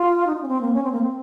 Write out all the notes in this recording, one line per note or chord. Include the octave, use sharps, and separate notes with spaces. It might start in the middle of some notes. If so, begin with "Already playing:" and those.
Already playing: F4
D#4
F4
C#4
C4
A#3
C#4
C4
A#3
C4